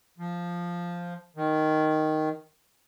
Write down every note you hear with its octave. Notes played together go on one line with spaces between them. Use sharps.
F3
D#3